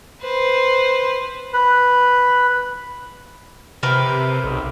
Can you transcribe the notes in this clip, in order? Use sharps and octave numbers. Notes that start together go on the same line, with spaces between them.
B4 C5
B4
C3 A#4 B4 G5
B1